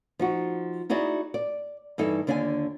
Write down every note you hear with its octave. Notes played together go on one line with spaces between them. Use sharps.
F3 D#4 F#4
D#4 E4 F#4 G#4 D5
D5
G2 E3 D#4 A4
D#2 D3 D4 F4 D5 G#5